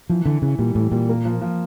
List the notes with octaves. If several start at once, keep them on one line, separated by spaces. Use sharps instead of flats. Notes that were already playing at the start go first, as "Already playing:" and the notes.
E3 F3
D3 E3
C#3 E3
A#2 G3
A2 E3
A#2 G3
A#3
F3
F3